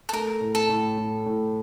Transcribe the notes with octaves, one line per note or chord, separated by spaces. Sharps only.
A4
A3 A#4
A2
A4
A2
A2
A2